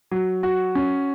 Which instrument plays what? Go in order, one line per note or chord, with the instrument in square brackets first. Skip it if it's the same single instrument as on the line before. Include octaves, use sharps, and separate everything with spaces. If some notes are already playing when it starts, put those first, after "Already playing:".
[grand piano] F#3
F#4
C#4